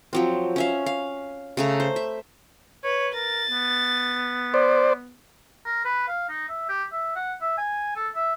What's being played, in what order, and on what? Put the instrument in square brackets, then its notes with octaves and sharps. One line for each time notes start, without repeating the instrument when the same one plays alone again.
[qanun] F3 F#3 C4
C#4 E5 F5
F5
C#3 A3 A#5
C5
E5
[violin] B4 [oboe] C#5
[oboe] A#4 [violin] A6
[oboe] B3
[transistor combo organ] C5 D5
[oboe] A#4
B4
F5
D#4
E5
G4
E5
F#5
E5
G#5
A4
E5